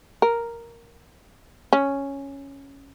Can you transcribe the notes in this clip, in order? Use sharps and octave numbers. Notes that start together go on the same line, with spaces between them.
A#4
C#4